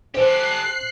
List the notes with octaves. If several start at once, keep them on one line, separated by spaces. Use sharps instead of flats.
G4 A4 C5 F#6 C7